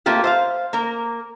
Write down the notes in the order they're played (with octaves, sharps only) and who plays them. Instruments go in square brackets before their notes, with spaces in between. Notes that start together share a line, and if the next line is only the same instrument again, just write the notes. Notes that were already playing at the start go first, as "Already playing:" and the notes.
[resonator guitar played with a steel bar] A3 A#3 C4 F4 G4
C5 E5 F5
A#3 A#4